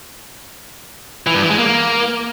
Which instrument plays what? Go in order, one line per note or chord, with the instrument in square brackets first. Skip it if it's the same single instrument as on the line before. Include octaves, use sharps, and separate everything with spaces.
[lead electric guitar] E3
G2
E3
G#3
A#3